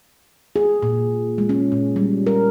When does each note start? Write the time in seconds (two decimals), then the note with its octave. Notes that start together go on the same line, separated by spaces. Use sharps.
0.56 G#4
0.83 A#2
1.38 G#3
1.49 C#4
1.72 A#2
1.96 G3
2.27 A#4